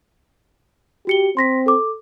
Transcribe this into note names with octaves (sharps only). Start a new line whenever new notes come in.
F#4 G4 C#7 G7
C4 C6 A#6 B6
A4 D6